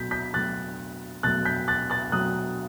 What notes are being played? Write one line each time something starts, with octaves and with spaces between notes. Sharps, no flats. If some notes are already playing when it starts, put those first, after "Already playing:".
Already playing: B2 F#3 A3 G6 B6
G6 B6
B2 F#3 A3 F#6 A6
B2 F#3 A3 F#6 A6
G6 B6
F#6 A6
F#6 A6
B2 F#3 A3 D#6 F#6